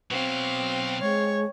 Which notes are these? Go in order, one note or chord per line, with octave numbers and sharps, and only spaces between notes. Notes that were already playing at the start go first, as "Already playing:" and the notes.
B2 F#3 C4 F5
G#3 C#5